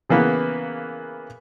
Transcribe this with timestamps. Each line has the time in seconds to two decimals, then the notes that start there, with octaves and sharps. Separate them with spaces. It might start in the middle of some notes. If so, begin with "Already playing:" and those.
0.09 C#3 E3 A#3 B3